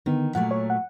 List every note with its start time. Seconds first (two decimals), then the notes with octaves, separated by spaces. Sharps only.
0.06 D3 D#3 B3
0.35 A#2 F#3 A3 F#5
0.51 C#5
0.70 F#5